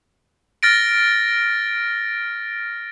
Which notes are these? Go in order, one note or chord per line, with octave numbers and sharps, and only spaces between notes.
F6 A6 A#6 D7